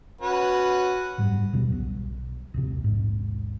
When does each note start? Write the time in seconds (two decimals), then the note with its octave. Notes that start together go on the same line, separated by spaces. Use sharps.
0.21 C#4 F#4 B4
1.18 F#1 G#2 G3
1.53 D#2 B2 F#3 G3
1.72 B1
2.54 A#1 D#2 C3
2.84 A#1 D#2 G#2